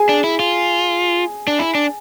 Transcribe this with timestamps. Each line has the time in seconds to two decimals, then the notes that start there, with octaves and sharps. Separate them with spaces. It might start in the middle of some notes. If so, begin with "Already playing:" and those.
Already playing: G#4 G#5
0.09 D4
0.24 E4
0.39 F4
1.47 D4
1.59 E4
1.75 D4